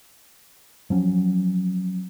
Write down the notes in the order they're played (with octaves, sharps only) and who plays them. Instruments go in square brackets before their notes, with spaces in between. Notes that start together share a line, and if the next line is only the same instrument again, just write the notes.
[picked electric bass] F3 F#3 C#4